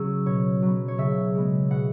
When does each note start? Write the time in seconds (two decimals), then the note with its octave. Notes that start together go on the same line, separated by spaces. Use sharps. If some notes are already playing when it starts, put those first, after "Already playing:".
Already playing: C#3 F#3 C#4 E6
0.26 B2 C#5
0.62 F#3 B3
0.88 C#5
0.98 C#3 E5
1.35 G#3 B3
1.70 B2 F#5